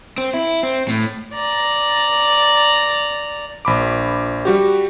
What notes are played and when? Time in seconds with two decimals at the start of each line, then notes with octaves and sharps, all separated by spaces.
0.18 C4
0.34 E4
0.63 C4
0.88 A2
1.34 D5 A#5
3.65 A#1 B5 D6
4.45 G3 F#4 G4